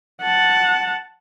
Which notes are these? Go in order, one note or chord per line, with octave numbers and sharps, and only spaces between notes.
F#5 A5